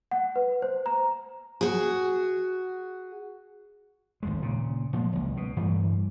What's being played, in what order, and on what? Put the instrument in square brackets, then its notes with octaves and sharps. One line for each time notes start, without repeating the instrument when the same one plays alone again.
[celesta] F#5
B4
C5
A#5
[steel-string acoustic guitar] F#4 G#4
[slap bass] G#1 D2 G#3
A#2 C#3
A#2 F3 G#3
F#1 C#2
B2
G2 E3 G3 A3